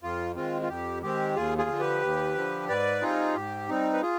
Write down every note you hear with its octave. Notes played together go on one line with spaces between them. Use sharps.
F2 F4
D#3 G#3 C4 F4
F4
F2 G4
D#3 G#3 C4 G4
D#2 F4 G#4
F4 G#4
D3 F3
G4 B4
D#2
D3 F3
G#2 B4 D5
G3 C4 D#4 F4 G#4
G#2 G4
G3 C4 D#4
B4
F4 G#4